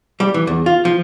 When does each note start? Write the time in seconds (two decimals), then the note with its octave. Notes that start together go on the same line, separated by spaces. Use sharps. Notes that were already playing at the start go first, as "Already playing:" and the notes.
0.20 G3
0.34 E3
0.47 E2
0.66 F4
0.85 F3